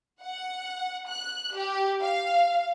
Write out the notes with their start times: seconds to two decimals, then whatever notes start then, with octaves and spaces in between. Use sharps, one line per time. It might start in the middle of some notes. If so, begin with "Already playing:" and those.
0.22 F#5
1.08 F#6
1.56 G4
2.02 F5